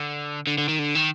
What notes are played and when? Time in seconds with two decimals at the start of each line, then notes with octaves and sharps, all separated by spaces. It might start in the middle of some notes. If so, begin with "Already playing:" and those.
Already playing: D3
0.47 D3
0.58 D3
0.68 D#3
0.79 D3
0.95 D#3